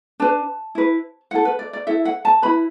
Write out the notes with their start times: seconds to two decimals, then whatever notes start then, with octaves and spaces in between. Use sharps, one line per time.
0.20 D4 B4 A5
0.75 E4 B4
1.31 E4 A4 F#5
1.45 B4
1.59 D5
1.73 D5
1.87 E4 A4 E5
2.05 F#5
2.25 A5
2.42 E4 B4 B5